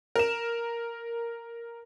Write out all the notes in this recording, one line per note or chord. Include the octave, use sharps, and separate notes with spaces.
A#4 E7